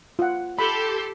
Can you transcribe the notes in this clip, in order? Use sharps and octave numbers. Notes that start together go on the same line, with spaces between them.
F4 F#5
G4 A4 B5 C6